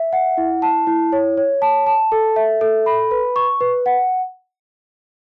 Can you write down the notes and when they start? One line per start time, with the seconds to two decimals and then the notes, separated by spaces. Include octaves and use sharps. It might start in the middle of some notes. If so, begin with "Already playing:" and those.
Already playing: E5
0.13 F#5
0.38 E4
0.62 A5
0.87 E4
1.12 C#5
1.37 C#5
1.62 A5
1.86 A5
2.12 A4
2.36 E5
2.61 A4
2.86 B5
3.11 B4
3.36 C#6
3.61 B4
3.86 F#5